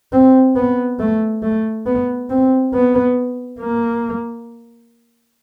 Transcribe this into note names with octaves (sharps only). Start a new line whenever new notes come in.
C4
B3
A3
A3
B3
C4
B3
A#3